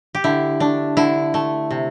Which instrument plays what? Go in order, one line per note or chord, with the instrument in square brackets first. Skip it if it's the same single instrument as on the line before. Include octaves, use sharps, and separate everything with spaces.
[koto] G4
D3 E4
A3 D4
D3 E4
A3
C3